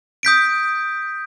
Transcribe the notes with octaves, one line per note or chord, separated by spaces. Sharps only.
D#6 G6 B6 D7